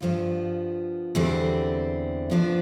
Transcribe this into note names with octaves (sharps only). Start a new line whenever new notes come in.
G2 F3 B3 F4
E2 D3 G3 C4
G2 F3 B3 D4